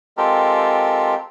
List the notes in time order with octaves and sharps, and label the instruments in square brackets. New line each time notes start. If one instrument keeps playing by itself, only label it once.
[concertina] G#3 C4 F4 G4 A4 A#4